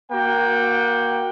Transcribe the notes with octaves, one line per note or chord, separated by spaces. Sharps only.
A#3 F#4 G5